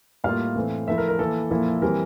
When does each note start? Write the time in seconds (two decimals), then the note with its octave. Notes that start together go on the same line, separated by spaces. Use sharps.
0.24 A2 G3 A#3 F4 F5
0.56 A2 E3 A3 C4
0.88 F3 A3 E4 E5
0.98 A#4
1.08 A#4
1.19 E3 A#3 E4 A4
1.51 A#2 F3 A#3 E4
1.82 E3 G3 C4 A#4